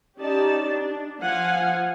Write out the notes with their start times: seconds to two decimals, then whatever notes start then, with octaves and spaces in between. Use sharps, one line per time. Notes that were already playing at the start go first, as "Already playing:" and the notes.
0.17 C#4 D#4 G4 D5 A5
0.67 D4
1.19 F3 F5 F#5 G#5